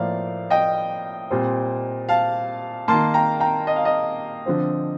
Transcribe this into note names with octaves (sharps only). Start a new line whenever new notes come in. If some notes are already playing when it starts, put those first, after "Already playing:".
Already playing: A2 F3 A#3 D5 F5
D#5 G5
A#2 G3 C4
F5 A5
D#3 A#3 A5 C6
G5 A#5
G5 A#5
D#5
F5
D#5
D3 F3 C4